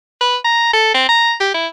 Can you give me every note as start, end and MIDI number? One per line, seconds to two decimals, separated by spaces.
0.21 0.36 71
0.45 0.71 82
0.73 0.94 69
0.94 1.06 60
1.09 1.33 82
1.40 1.50 67
1.54 1.67 64